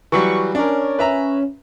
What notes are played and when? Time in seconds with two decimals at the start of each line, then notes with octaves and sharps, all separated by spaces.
0.12 E3 F#3 G3 C#6
0.55 C#4 D4 A#4
0.99 B4 E5 A#5